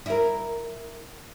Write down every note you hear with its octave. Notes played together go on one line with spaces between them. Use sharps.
E4 A#4